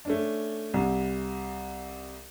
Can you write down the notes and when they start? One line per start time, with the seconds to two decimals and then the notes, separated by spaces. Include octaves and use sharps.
0.05 A3 C#4 D4
0.74 C2 C3